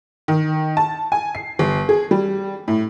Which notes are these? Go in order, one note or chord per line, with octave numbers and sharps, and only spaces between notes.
D#3
A5
G#5
C7
G1
G#4
G3
A2